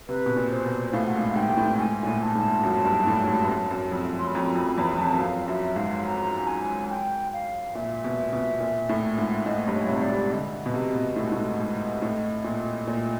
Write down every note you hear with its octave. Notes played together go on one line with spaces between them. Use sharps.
C3 B4
B2
A#2
C5
B2
A2 F5
F#5
G#2
F5
G#2 G5
G#2
A2
G#2 G#5
A#2
A2
A5
G#2
F#2
G2
A2
G#2
G2
F#2
F#2
F2
C6
B5
F2 A#5
F2 B5
E2 B5
F2 A5
F#2
F2 F5
F#2 E5
G#2 F5
A#5
G#5
G5
F5
A#2 E5
B2
B2
A#2
A2
G#2
A2 D#5
G2
C#5
C3
C#5
D5
C3
D3 D#5
B2
C3
B2
A2
G#2
A2
G#2
A2
A#2
A#2